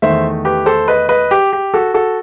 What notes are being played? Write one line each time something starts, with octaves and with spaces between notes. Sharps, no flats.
E2 D#3 A3 C5 E5
G4 B4
A4 C5
B4 D#5
B4 D#5
G4
G4
F#4 A4
F#4 A4